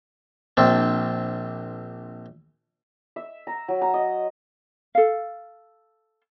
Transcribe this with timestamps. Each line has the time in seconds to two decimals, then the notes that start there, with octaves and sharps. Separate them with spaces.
0.57 A#1 C4 D4
3.16 E5
3.47 A#5
3.68 F#3
3.82 A#5
3.94 D#5
4.95 A4 F5